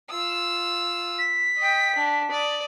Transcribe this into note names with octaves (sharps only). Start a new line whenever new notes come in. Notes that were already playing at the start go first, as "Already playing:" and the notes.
F4 E6
B6
D#5 G5
D4
D5 D#6